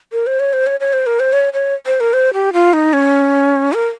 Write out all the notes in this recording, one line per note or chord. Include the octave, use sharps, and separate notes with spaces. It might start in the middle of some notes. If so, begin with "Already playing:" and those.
A#4
C5
C#5
C5
C#5
C#5
C5
A#4
C5
C#5
C#5
C5
A#4
C5
G4
F4
D#4
C#4
A#4